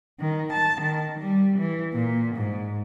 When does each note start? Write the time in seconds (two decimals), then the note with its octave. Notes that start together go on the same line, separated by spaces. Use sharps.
0.20 D#3
0.53 A5
0.82 D#3
1.19 G3
1.58 E3
1.93 A#2
2.35 G#2